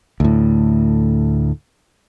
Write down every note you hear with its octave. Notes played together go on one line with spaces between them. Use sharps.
D2 A2